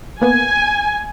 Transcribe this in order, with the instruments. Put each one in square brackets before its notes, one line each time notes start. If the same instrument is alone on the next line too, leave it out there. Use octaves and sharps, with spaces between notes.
[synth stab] A#3 B3 [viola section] G#5